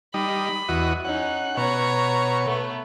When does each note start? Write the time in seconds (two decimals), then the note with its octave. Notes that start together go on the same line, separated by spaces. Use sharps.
0.14 G3 D#4 B5
0.69 E2 F#4 D#5
1.05 C#4 D#4 F#5
1.57 B2 C#5 A#5 C#6
2.46 A3 B3